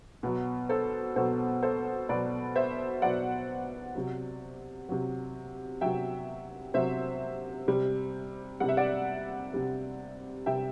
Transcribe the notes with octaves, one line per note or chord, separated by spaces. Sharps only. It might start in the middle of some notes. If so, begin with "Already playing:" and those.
B2 F#3
A4 C5
B2 F#3 A4 C5
A4 C5
B2 F#3 B4 D5
C5 E5
B2 F#3 D5 F#5
C3 F#3
C3 F#3
C3 F#3 E5 G5
C3 F#3 C5 E5
C3 G3
C3 G3 F#5
E5
D5 F#5
C3 G3
C3 G3 E5 G5